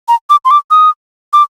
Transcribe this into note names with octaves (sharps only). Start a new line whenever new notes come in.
A#5
D6
C6
D6
D#6
D6